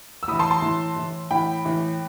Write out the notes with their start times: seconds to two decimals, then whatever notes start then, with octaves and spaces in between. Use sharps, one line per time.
0.23 E6
0.28 A2 B5 D#6
0.32 E3
0.39 A5 C6
0.51 A5 C6
0.62 A2 E3
0.96 A2 E3
1.31 A2 E3 G5 B5
1.65 A2 E3